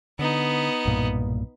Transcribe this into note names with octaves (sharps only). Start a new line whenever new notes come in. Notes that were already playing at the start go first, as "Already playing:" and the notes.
D3 B3 D#4
B1 G2 A#2